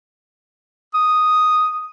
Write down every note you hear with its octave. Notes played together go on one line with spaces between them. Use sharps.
D#6